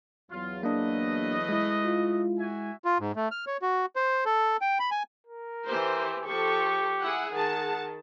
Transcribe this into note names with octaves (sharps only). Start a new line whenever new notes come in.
E2 F#3 F4
A3 A#3 D4 B4 D#5
G#3 E4
F4
F#4 E5 G#5
F4
G#2
A3
F6
C#5
F#4
C5
A4
G5
B5
G#5
A#4
E3 G4 C5
F3 G4 A4 C#6
E4 G#4 F#5
D#3 G#4 F#5 A5